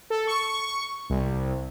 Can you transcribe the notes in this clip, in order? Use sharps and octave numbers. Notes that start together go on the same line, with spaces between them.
A4
C#6
C2